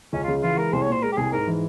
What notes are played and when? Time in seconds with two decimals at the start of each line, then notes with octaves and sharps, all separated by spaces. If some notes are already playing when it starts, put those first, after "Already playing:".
0.13 C#2 C#4
0.24 C#3 F4
0.43 E3 F4
0.57 G#3 A#4
0.73 C2 C5
0.82 C#5
0.87 A#2
0.92 C5
1.02 G#3 A#4
1.12 G4
1.17 C2 G#4
1.33 G#2 A#4
1.47 E3